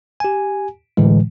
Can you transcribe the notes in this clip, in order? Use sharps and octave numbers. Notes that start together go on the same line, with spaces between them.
G4 G#5
A2 D3 E3 G#3